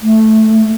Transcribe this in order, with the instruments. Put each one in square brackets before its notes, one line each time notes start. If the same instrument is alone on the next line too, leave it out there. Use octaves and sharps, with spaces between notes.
[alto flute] A3